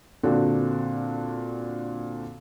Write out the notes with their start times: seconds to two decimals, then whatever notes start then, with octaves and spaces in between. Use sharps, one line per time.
0.23 A#2 D3 C4 D4 F#4 A4